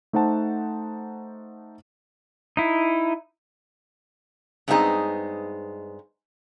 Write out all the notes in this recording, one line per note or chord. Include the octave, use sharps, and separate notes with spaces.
A3 D#4 C5 F#5 A5
D#4 E4
G2 G#3 B3 C4 D#4 G#4